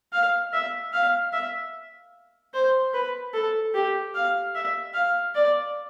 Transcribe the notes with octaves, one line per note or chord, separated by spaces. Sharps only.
F5
E5
F5
E5
C5
B4
A4
G4
F5
E5
F5
D5